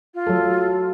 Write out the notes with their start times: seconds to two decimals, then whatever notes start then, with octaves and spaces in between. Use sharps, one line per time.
0.15 F4
0.27 F#3 A4